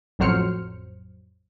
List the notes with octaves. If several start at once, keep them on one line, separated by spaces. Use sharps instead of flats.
A1 F2 F#3 C5 F6 C#7